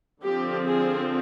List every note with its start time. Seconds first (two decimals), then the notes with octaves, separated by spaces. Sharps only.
0.22 D3 F3 C4 G4
0.66 G#4